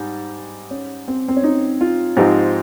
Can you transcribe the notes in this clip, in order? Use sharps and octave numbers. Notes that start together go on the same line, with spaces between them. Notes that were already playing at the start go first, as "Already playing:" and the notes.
Already playing: G#2 G3 D#4
C#4
C4
C4
C#4
D#4
F4
G#2 F3 C4 D#4 G4